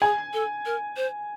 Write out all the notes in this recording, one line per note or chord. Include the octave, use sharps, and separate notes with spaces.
G#4 G#5
A4
A#4
C5